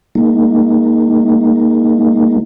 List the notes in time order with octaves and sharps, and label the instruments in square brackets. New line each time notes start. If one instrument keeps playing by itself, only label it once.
[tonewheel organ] G#3 A#3 D#4